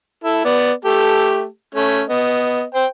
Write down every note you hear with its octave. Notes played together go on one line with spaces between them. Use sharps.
E4 A4
B3 D5
A3 G4 A4
A3 C#4
B3 D#5
C5 G5